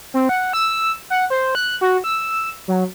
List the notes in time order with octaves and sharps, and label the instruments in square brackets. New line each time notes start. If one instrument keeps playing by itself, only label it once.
[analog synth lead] C4
F#5
E6
F#5
C5
F#6
F#4
E6
F#3